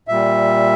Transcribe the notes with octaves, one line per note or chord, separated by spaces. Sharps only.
A#2 G3 E5